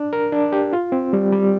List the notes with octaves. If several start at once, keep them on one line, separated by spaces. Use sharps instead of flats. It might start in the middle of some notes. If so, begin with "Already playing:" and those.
Already playing: D4
A#4
D4
G4
F4
C4
G3
G3